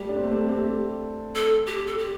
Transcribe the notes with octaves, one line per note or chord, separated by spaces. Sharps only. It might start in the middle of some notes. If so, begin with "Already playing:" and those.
Already playing: G3 A3 G4
D4
C4
A3
C4
A3
C4
A3
A4
G4
A4
G4